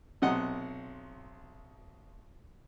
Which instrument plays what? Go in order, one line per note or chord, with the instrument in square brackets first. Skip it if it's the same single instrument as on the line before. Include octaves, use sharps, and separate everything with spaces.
[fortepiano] B1 C3 D#5 F#5